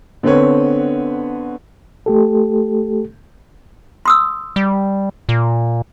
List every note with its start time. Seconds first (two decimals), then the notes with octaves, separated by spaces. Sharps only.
0.23 D3 B3 C4 B4 C#5
2.06 A3 G4 A4
4.06 C6 D#6 E6
4.56 G3
5.29 A#2